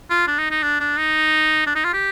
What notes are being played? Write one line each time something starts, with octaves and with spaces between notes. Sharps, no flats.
F4
D4
D#4
D#4
D4
D4
D#4
D4
D#4
F4
G4